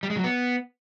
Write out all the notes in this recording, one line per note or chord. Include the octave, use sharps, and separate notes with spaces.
G3
G#3
F#3
B3